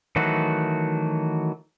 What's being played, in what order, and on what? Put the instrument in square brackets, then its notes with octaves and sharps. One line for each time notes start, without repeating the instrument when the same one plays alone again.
[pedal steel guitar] D#3 E3 F#3 A3 F#4